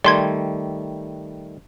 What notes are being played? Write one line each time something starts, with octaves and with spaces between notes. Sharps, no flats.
D#3 G3 A3 D5 C6 G#6